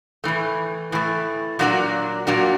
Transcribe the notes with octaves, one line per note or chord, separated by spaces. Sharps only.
A2 E3 A3
A2 E3 A3
A#2 F#3 A#3 D4 F#4
A#2 F#3 A#3 D4 F#4